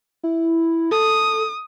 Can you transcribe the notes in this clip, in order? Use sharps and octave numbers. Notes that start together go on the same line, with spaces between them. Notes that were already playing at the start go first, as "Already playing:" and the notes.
E4
A4 D#6